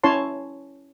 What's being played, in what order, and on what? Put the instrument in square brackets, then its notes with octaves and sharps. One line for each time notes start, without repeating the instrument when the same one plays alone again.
[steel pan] C#4 E4 C#5 A5 C6